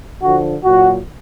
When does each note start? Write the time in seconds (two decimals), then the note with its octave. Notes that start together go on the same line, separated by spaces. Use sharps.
0.22 D3 F3 F#4
0.63 A#2 F#3 F#4